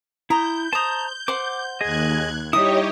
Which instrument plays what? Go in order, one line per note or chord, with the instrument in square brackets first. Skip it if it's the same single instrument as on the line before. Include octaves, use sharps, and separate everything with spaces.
[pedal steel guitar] E4 [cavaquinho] A#5 D#6 [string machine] G6
[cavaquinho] C5 D#6 [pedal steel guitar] A5 A#5
[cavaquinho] C5 F#5 [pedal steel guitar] D6
[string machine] D#2 F#6 G#6 [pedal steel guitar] G#4 D#5
[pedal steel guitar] G3 D#4 E4 [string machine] G4 C#5 D#5 [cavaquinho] D#6